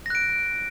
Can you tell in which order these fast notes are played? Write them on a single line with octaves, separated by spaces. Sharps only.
A#6 F#6 D7